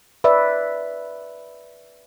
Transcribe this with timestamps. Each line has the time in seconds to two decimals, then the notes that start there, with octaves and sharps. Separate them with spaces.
0.24 B4 D5 E5